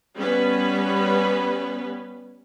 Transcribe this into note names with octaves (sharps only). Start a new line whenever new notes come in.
G3 B3 C#4 B4